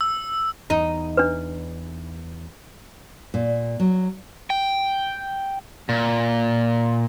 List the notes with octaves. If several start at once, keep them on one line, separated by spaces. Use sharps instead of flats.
E6
E2 D#4
D4 B4
A#2
F#3
G5
A#2